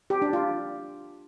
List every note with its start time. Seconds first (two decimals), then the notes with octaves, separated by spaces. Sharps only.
0.10 G4
0.22 D4
0.33 F4